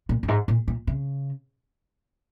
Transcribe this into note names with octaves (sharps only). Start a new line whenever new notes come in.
A#2
F#2
G#2
A#2
A#2
C#3